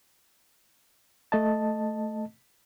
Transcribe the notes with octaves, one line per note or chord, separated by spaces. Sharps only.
A3 D#5 A5